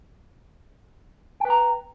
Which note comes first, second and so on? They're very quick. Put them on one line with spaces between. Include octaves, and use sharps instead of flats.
G5 B4 A#5